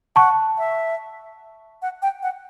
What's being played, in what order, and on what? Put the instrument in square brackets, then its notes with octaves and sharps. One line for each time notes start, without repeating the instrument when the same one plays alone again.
[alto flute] F#5 [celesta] A5 C#6
[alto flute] E5
F#5
G5
F#5